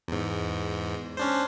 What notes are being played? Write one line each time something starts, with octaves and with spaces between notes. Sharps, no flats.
E2 G#2
C#4 D4 C5